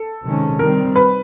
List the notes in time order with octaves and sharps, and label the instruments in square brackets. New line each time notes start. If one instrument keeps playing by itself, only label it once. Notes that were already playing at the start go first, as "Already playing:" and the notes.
Already playing: [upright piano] A4
[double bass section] C3 D#3 G#3 C#4
[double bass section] D#3 G3 C4 [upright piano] A#4
[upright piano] B4